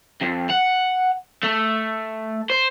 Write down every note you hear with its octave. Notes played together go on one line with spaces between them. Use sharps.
F2
F#5
A3
C5